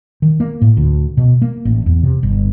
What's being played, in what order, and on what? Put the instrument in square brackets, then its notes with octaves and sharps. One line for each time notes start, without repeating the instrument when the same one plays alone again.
[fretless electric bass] D#3
A#3
A2
D2
B2
A#3
A1
E2
C3
G1